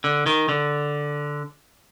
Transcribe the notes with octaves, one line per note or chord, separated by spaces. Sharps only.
D3
D#3
D3